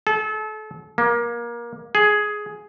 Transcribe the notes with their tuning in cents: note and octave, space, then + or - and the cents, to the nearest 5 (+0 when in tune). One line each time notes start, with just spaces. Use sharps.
A4 -35
A#3 +25
G#4 +10